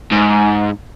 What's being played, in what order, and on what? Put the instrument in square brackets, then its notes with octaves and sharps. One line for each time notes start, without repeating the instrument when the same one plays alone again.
[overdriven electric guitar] G#2